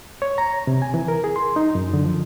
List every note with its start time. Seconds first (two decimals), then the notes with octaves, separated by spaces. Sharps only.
0.22 C#5
0.38 A#5
0.67 C3
0.82 G#5
0.94 E3
1.08 A#4
1.24 G#4
1.36 C6
1.56 D#4
1.75 F#2
1.94 D3
2.05 F3